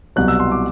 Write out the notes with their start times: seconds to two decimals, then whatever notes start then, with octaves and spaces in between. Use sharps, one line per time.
0.16 C2 B2 F#3 F#6
0.28 E6
0.40 C6
0.52 D6